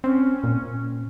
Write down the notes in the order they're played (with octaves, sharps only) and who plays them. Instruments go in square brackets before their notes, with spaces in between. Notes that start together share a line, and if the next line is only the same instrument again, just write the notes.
[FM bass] C4 [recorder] C#4
[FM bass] A#2